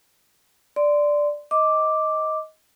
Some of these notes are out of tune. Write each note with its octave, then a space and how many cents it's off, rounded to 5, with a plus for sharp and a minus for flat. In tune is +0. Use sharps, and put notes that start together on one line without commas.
D5 +0 C6 -15
D#5 +15 D6 +0